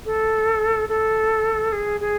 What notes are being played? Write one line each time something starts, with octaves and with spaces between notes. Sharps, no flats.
A4
A4
G#4
G#4